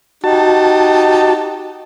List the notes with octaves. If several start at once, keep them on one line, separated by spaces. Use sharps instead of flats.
D#4 F#4 G4 A5